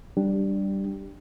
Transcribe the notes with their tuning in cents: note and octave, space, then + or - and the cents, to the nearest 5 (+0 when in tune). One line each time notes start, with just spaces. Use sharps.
G3 -10 D4 +0 G4 +0